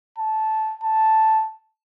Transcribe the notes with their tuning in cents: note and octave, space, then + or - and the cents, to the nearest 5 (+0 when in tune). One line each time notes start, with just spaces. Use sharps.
A5 -10
A5 +0